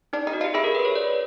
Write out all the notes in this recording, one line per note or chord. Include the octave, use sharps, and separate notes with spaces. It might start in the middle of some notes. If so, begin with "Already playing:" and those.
D4 D#4
D#4
F#4
F4
G4
E4 G#4
A#4
B4
C#5
D5